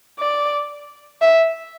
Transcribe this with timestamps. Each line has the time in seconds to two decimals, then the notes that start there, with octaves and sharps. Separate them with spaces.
0.20 D5
1.21 E5